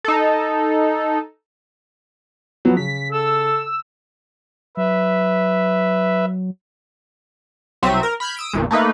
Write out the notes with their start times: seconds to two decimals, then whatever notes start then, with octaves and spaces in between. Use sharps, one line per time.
0.04 D#4 A4
2.65 F3 F#3 B3
2.77 C#3 B6
3.12 A4 E6
4.77 F#3 B4 E5
7.82 C2 F#3 C4 E5 D#7
8.03 A#4
8.20 B5 F6 G6 G#6 B6
8.37 D#6 E6 D7
8.53 G#1 E2 A#2
8.71 A3 A#3 D#4 B4